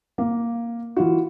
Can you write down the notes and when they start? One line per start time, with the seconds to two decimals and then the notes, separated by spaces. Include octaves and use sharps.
0.18 A#3
0.96 E3 F4 F#4